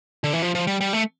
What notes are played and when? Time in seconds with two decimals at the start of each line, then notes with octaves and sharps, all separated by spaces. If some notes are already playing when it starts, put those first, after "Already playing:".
0.24 D3
0.33 E3
0.42 F3
0.55 F3
0.67 G3
0.81 G3
0.93 A3